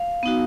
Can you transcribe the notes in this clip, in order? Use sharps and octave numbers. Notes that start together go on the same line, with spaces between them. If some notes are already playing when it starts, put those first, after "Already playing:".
Already playing: F5
B3 D#4 F#4